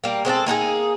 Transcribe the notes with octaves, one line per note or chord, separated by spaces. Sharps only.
G3 A#3
G#3 C4 F#4 A4
A#3 D#4 F#4 G#4